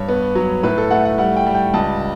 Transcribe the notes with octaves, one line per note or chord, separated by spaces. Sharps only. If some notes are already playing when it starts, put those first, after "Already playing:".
Already playing: G2 C#5
B3
F#3
A2 B4
A4
A3 F#5
F#5
G3 F#5
G5
G3
G5
C#2 A5